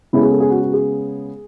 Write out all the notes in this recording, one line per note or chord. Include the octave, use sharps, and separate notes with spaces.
C#3 G#3 B3 E4
G#4
A4
G#4
F#4
F#4
G#4